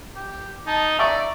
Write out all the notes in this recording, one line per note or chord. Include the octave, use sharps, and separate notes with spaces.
G4
D#4 A5
D5 E5 A#5 C#6